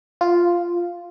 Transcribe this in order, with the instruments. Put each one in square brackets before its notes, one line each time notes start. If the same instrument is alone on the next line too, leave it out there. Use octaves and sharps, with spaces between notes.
[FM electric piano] F4